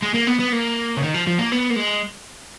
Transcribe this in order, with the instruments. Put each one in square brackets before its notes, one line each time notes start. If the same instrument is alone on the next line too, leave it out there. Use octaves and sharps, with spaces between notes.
[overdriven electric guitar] G#3
A#3
B3
B3
A#3
C#3
D#3
F3
F3
A#3
B3
A#3
G#3